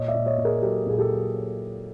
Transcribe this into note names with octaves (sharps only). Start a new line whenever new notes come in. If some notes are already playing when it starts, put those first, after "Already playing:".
Already playing: A#2 C#5 D#5
D5 E5
A#2
C#5 D#5
A#2
G#4 A#4
F#3 G4 A4
A#2 G#4
G4 A4
F#3